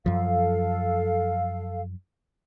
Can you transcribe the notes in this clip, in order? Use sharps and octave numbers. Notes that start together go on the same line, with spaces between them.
F#2 F3 A4 F5